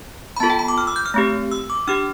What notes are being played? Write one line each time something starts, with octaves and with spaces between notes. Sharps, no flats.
B5
B3 F4 A4 A5
G5
B5
D6
F6
E6
G6
F6
A3 C4 G4
E6
D6
D4 G4 F6